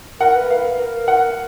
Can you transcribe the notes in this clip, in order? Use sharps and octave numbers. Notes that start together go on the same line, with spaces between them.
A#4 F#5
B4
B4 F5
A#4
F#5